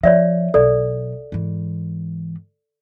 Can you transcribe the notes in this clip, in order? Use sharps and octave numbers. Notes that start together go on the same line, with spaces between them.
F3 C#5 D5 E5
B1 A4 D5
G#2 E3